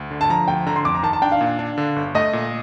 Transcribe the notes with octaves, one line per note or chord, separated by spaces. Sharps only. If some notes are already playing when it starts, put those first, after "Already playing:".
Already playing: D2
D3
A5
F3 A#5
D2 G5
D3 A#5
C6
F2 D6
A#5
D#3 A5
A5
D4 G5
F5
A#2
D4
D3
G1
A3 D#5
A#2